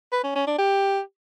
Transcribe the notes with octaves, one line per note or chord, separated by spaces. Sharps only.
B4
C#4
C#4
D4
G4